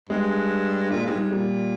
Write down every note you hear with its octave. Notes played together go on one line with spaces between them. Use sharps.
G2 G#3
A#2 G#3
G2
G#2 G3
A#2 G3